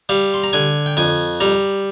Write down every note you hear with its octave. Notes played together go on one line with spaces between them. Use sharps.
G3 F5
C6
A#5
D3 G#5
G5
F2 G#5
G3 A#5